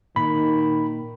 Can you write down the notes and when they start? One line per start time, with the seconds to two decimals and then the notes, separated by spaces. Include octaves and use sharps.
0.16 A#2 D#3 B5